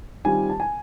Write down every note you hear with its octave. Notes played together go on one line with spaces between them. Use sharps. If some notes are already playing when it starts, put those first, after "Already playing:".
D#3 G3 C4 F4 G#5
A5
G#5